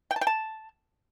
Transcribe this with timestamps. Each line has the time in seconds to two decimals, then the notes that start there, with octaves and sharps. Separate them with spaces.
0.11 G5
0.16 A5
0.21 G5
0.27 A5